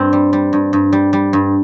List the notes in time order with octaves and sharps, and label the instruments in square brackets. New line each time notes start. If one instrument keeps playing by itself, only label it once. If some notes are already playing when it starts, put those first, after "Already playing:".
Already playing: [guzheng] G2 C4
G3
G3
G2
G2
G3
G3
G2